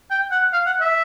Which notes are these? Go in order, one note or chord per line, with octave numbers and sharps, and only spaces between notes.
G5
F#5
F5
F#5
E5